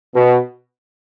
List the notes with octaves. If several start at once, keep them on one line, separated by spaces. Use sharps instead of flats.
B2